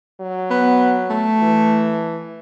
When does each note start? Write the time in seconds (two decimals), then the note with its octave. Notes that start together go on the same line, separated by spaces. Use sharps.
0.21 F#3
0.51 B3
1.10 A3
1.41 E3